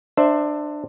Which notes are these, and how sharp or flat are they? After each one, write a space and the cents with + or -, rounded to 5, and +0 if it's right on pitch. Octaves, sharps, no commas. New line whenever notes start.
D4 +20 C5 +5 E5 +0